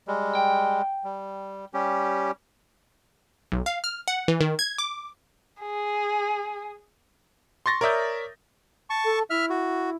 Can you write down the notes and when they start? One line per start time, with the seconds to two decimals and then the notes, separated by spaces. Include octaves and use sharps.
0.08 G3 G#3
0.35 G5
1.04 G3
1.74 G3 C#4 G4
3.52 B1
3.66 F5
3.84 F6
4.08 F#5
4.28 E3
4.41 D#3
4.59 G#6
4.78 D6
5.62 G#4
7.66 C6 C#6 A6 A#6
7.81 A#4 C#5 D5 E5 D#6 G6
8.90 A5 C#6
9.05 A4
9.30 E4 E5 F6
9.50 F#4